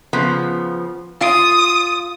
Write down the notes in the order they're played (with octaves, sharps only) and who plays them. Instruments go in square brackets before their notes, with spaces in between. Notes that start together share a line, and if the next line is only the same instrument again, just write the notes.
[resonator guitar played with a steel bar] C#3 F3 B3
[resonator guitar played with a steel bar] F4 [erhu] D#6